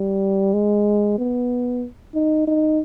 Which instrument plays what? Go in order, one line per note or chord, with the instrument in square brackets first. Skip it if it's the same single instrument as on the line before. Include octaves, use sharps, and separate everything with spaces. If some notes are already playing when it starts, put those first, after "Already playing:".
Already playing: [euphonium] G3
G#3
B3
D#4
D#4